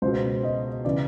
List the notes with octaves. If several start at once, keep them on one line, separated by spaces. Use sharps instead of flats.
C#2 B2 C5
D#5
C#3 E3 D5